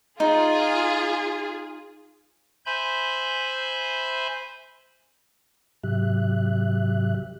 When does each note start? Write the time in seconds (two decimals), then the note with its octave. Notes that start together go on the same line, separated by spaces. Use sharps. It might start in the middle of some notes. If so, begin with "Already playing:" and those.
0.20 D#4 F4 G#4
2.66 C5 E5 G#5 B5 C6 G6
5.84 G#2 C3 F#3 G4 E5 F#6